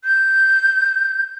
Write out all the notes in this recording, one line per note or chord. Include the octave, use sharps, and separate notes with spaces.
G6